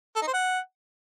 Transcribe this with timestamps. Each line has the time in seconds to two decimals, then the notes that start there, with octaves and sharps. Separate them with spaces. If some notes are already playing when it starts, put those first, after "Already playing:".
0.16 A4
0.21 D#4
0.27 C5
0.33 F#5